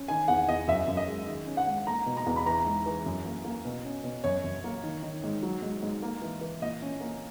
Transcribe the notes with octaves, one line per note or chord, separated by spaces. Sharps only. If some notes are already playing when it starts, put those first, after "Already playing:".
Already playing: C#4
D#3 G#5
E2 F#5
E2 D#5
F#2 E5
F#2
D#5
G#3
D#3
C#4
F#5
G#2
A#3 A#5
B2
A#5
E2
B5
E3 A#5
G#2
E3
F#2
A#3
A#3
B2
C#4
B2
F#2 C#5
F#2
A#3
D#3
D#3
G#2
F#3
G#2
G#2
A#3
E3
E3
A#2 D#5
C#4
A#3